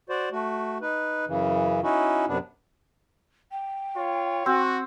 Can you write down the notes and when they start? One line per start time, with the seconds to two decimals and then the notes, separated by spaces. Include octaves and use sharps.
0.09 F#4 C5 D5
0.32 A3 F#4
0.81 D#4 B4
1.28 F#2 C#3 E3
1.83 C#4 D#4 E4 F#4
2.28 F#2 C3 B3 D4
3.51 G5
3.96 F4 C#5
4.46 C4 F#4